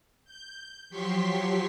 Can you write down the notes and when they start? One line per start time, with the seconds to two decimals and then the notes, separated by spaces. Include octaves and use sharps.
0.25 G6
0.90 F3 F#3 G4 C6 C#6 B6